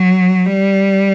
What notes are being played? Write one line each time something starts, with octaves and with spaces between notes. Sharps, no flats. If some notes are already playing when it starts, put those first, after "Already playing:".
Already playing: F#3
G3